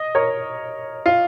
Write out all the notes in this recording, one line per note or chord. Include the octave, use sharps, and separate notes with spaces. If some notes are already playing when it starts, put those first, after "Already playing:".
Already playing: D#5
A#4 C#5
F4